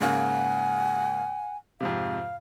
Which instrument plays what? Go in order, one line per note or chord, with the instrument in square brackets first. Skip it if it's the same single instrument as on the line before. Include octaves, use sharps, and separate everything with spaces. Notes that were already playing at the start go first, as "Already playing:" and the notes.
[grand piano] G#2 C#3 A#3 [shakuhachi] F#5 [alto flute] G#5
[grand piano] F2 G#2 C3 [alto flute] F5